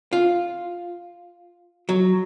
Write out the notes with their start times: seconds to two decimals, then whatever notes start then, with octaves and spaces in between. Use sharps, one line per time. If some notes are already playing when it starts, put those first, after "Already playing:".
0.13 F4
1.89 F#3